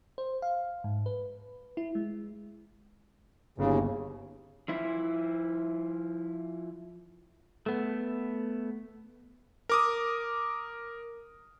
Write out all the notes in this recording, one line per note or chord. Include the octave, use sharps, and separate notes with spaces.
C5
F5
G#2
B4
E4
G#3
G1 D#2 C#3
F3 E4
A3 B3
A#4 D6 D#6